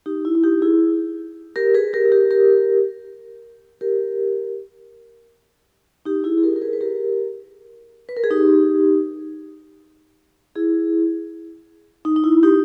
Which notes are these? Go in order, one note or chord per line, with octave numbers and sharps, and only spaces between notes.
D#4 G4
E4
E4
D#4 G4
E4 G#4
G4 A#4
G#4 B4
G4 A#4
G4 A#4
G4 A#4
G4 A#4
D#4 G4
E4 G#4
G#4
G4 A#4
A#4
G#4 B4
B4
G4 A#4
B4
A#4
G#4
D#4 G4
E4 G#4
D#4
D#4
E4
D#4 G4